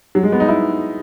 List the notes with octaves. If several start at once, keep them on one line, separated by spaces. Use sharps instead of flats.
F#3
G#3
B3
D#4
E4